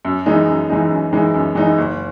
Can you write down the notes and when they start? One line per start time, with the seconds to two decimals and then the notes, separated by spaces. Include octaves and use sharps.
0.05 F#2
0.26 E3 G#3 D#4
0.48 F#2
0.70 E3 G#3 D#4
0.91 F#2
1.13 E3 G#3 D#4
1.34 F#2
1.55 E3 G#3 D#4
1.78 F#1